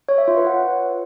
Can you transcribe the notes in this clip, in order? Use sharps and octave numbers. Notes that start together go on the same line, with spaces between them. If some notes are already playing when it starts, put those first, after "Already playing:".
C#5
E5
F4
B4
F#5